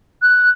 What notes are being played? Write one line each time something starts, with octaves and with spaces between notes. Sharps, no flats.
F#6